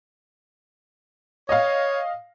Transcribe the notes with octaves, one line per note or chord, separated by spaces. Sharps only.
C#5 D#5 F5